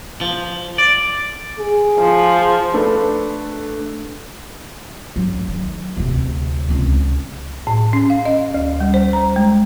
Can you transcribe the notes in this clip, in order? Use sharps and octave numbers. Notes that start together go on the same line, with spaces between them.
F3
D5
G#4
F3
A3 D4 A4 B4
G2 F#3
D#3
D2 C3
C#2 C4
A2
C#4
F5
D#5
D2
G3
C5
A#5
G#3